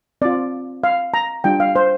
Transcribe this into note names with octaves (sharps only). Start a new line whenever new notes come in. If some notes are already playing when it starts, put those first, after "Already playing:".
C4 F4 D5
F5
A#5
G3 D4 F4 G5
F5
C5